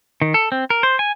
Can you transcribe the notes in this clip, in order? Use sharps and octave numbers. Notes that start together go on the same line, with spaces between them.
D#3
A4
C4
A#4
C5
G#5